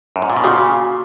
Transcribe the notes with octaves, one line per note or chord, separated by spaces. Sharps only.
F#2
G#2
A#2
B2
A#2 C#3 F#4